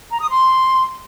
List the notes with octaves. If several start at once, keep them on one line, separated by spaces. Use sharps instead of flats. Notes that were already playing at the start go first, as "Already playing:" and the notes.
A#5
D#6
C6